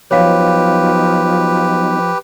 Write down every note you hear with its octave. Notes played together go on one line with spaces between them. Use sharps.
F3 F#3 B3 D#4 G4 B4 C#5 F5